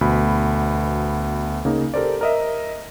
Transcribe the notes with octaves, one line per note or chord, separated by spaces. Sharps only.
D2 B2 B5
C#3 A#3 D#4
G4 A4 A#4 C5 D5
A#4 D#5 E5